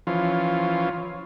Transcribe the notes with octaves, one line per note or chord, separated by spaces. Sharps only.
E3 F3 C#4 F4